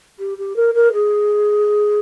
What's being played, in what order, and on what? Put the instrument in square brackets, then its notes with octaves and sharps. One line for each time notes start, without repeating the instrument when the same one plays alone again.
[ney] G4
G4
A#4
A#4
G#4